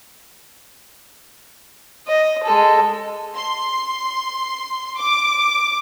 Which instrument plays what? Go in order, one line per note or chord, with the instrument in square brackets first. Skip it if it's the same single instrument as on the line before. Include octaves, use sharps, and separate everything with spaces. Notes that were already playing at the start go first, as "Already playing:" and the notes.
[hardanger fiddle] D#5
G#3 A4
[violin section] C6
D6